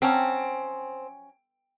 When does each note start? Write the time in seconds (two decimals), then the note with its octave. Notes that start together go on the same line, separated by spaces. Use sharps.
0.02 F3 F#3 C4 C#4